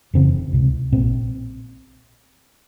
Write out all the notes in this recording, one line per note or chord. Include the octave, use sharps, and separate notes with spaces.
F1 E2 C#3 C4
C#2 C3
A#1 A#2 C4